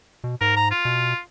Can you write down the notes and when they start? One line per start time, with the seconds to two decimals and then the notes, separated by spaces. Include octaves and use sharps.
0.24 B2
0.41 G#2 A#4
0.57 A#5
0.71 F4
0.85 B2